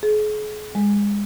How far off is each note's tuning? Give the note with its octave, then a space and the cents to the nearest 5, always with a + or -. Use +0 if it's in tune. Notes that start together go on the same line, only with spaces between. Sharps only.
G#4 +40
G#3 -25